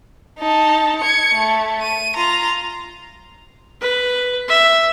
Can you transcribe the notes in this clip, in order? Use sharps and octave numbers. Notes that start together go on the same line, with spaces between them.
D#4 A5
G#6 C#7
A3
D#7
F4 A#5
B4
E5